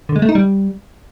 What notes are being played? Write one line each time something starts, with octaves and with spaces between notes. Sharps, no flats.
D3
G#3
A3
D#4
G3